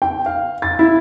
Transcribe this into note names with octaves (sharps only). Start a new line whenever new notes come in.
G5
F5
A6
E4